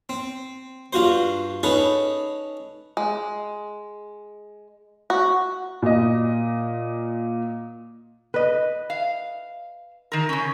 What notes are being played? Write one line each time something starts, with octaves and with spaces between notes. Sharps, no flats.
C4
G2 F4 F#4 C5
C#4 D#4 G#4 A4 B4
G#3
F#4
A#2 D#5
B4 D#5
F5
D#3 A#4
C#3 C#4